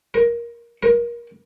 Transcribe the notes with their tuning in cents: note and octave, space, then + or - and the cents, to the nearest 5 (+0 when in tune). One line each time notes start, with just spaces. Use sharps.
A#4 +15
A#4 +25